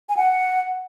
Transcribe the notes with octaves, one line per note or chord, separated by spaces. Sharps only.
G#5
F#5